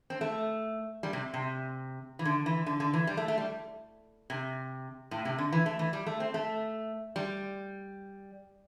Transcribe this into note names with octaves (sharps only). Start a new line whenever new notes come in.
C4
A3
G3
C3
C3
E3
D3
E3
D3
D3
E3
G3
A3
A3
G3
C3
A2
C3
D3
E3
A3
E3
G3
A3
C4
A3
G3